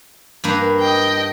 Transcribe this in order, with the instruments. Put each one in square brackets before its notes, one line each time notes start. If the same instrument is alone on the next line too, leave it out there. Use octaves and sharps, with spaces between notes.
[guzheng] G2 A#3 B4
[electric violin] D#5 G5